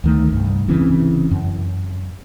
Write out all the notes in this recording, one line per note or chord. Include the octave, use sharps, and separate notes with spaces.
D2 D#3 A3
C2 G2
F1 C#3 E3 C4
F#2